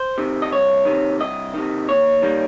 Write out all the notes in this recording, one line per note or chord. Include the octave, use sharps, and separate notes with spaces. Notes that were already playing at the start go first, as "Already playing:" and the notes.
Already playing: C5
C3 D#3
D#5
C2 C#5
C3 D#3
C2 D#5
C3 D#3
D#2 C#5
D#3 G3 A#3